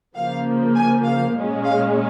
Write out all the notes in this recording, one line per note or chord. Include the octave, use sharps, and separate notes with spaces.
C#3 F3 A#3 F5
G#5
F5
A#2 G#3 C#4
F5